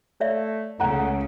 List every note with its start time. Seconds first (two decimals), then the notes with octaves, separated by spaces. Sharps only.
0.21 A3 C#5 D5 E5
0.80 C#2 C#3 A3 F#5 A#5